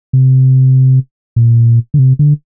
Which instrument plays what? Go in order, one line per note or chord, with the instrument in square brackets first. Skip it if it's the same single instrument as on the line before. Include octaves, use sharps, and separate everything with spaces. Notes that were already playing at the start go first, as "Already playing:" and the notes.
[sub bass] C3
A#2
D3
C3
D3